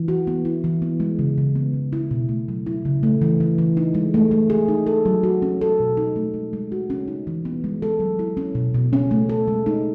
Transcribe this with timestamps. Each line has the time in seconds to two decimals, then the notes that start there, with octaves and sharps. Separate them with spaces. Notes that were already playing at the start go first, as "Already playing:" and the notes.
Already playing: E3
0.08 F#4
0.27 B3
0.45 E4
0.64 E3
0.82 B3
1.00 G#3
1.19 C#3
1.38 C#3
1.55 B3
1.74 E3
1.93 E4
2.11 B2
2.29 A3
2.48 F#3
2.66 E4
2.85 C#3
3.03 A3
3.22 E3
3.40 E3
3.58 E3
3.77 D#4
3.94 G#3
4.14 A3
4.31 A3
4.50 G#4
4.68 D#4
4.87 A4
5.06 F#3
5.23 F#4
5.42 C#4
5.61 A4
5.80 B2
5.97 D#4
6.16 A3
6.34 G#3
6.53 G#3
6.72 F#4
6.90 C#4
7.08 D#4
7.27 E3
7.45 B3
7.64 G#3
7.82 A4
8.00 F#3
8.19 E4
8.37 C#4
8.55 B2
8.74 B2
8.93 C#4
9.11 A3
9.29 A4
9.48 G#3
9.66 D#4